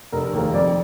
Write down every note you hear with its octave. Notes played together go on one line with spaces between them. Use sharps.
F1 A#4
D#2 D#3 A#3
F2 D5